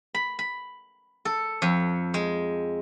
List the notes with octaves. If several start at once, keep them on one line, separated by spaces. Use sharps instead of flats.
B5
B5
A4
F2
G#3